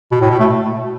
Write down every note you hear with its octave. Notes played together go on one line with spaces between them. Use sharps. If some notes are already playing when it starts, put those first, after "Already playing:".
B2
A2
B2
A3